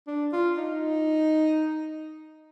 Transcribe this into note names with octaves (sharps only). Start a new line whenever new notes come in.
D4
F4
D#4